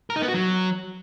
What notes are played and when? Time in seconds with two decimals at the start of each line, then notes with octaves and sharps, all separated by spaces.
0.10 A#4
0.16 D#4
0.22 B3
0.28 F#4
0.34 F#3